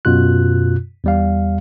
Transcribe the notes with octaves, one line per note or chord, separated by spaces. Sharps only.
F#2 B2 F4 F#6
E2 G3 F5